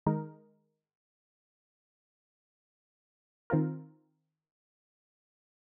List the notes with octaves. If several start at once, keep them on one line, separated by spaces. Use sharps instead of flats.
D#3 G#3 D#4 A#4
D#3 C4 F4 A#4